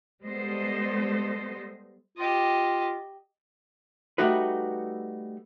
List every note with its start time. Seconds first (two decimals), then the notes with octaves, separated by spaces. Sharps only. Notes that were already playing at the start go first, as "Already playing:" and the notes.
0.23 G3 G#3 B3 A4 C5 D#5
2.18 F4 G4 D#5
4.18 G3 A3 D#4 F#4 B4